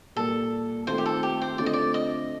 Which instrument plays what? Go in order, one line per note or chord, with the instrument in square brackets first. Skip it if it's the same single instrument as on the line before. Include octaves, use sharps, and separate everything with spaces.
[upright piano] A#2 G3 A#3 [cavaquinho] A4
[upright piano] D#3 A3 C4 F4 [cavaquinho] C5
[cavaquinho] G4
A4
G4
C5
[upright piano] D3 A3 C4 F4 [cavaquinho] D5
[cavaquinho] D#5
D5
D#5